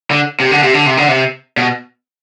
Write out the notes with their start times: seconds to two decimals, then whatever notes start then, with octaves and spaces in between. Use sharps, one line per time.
0.11 D3
0.40 C3
0.51 D3
0.63 C3
0.74 D3
0.86 C3
0.97 D3
1.08 C3
1.57 B2